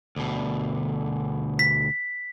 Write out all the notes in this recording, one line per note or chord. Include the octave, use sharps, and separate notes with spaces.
D2 B2
B6